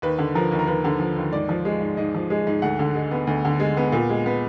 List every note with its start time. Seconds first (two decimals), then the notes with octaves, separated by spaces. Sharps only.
0.02 D#2 B4
0.19 D3
0.35 F3 A#4
0.52 D#2
0.59 A#4
0.67 D#2 B4
0.84 D3
1.00 F3
1.16 D#2
1.33 G#2 D5
1.49 F3
1.65 G#3
1.81 G#2
1.97 G#2 D#5
2.15 F3
2.30 G#3
2.47 G#2
2.62 D2 F#5
2.79 D3
2.95 G#3
3.11 B3
3.27 D2
3.45 D3
3.60 G#3
3.77 B3
3.92 A#2
4.09 G#3
4.26 B3